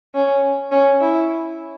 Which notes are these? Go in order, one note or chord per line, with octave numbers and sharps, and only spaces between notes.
C#4
C#4
E4